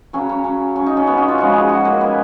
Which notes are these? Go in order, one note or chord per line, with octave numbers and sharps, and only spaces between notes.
C#3 F#3 C#4
C#4
C#4
C#4
D#4
C#4
B3
C#4
F4
C#3 F3 G#3 F#4
G#4
F#4
A#3
B3